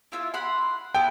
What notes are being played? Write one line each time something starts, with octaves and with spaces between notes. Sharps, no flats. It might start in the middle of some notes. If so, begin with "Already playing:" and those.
E4 F4 E5
F#5 B5 C6
B3 E4 A4 G5